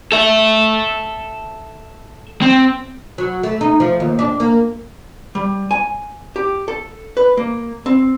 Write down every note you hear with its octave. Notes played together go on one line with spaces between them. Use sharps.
A4 E5
C4
F#3
A3
D#4
F3
D#2
D4
A#3
G3
G#5
G4
A4
B4
A#3
C4